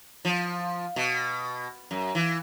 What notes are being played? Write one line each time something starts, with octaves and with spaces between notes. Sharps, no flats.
F3
B2
F#2
E3